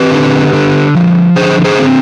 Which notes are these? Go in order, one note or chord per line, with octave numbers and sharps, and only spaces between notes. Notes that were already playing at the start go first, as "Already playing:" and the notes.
Already playing: C4 G4 B4
D3
D3
F3
D3 G#4 C5
G#4 C5
C4